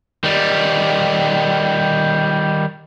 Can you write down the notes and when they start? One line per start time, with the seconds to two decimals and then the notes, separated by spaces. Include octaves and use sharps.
0.24 D#3 G3